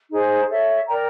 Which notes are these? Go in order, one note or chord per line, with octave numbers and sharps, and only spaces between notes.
D#4 G#4 C5
A4 C#5 E5
A#4 D5 G5 A#5